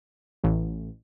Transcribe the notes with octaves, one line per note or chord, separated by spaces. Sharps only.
A1